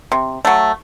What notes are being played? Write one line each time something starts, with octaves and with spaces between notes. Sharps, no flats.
C3
F#3 A3